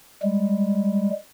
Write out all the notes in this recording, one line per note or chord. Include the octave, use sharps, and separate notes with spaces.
G3 G#3